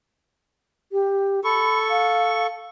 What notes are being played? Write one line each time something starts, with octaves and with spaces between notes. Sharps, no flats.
G4
A4 B5 C#6
F5